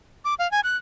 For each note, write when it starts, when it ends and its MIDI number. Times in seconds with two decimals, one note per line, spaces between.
0.25 0.34 86
0.39 0.49 77
0.51 0.60 80
0.64 0.76 90